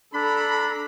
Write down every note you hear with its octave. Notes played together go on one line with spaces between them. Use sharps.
D4 A4 A#5 B5